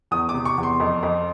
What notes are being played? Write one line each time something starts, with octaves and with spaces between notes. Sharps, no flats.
E2 D#6
D6
C3
C#6
E2
C6
F2
F2